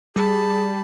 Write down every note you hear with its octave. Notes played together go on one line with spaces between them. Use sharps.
G3 G#4 A5 B5